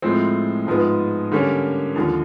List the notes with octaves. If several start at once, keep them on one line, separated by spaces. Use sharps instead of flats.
A2 F3 G#3 C4
G#2 F3 G#3 B3
D3 G3 A#3 C#4
D#2 D3 F3